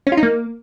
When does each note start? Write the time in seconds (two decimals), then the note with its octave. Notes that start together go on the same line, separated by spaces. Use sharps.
0.07 C#4
0.12 F4
0.17 D#4
0.23 A#3